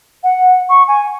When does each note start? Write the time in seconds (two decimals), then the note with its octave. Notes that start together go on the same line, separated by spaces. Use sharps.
0.23 F#5
0.69 C#6
0.88 G#5